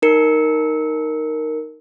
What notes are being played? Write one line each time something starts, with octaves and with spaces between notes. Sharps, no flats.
D#4 A#4 C#7